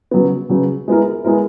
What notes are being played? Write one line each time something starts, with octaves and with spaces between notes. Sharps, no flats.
C#3 F#3 B3
C#3 F#3 B3
G#3 B3 E4 A#4
G#3 B3 E4 A#4